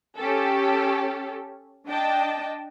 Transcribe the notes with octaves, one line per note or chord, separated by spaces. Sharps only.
C#4 G4 A4
D4 D#5 G5 A5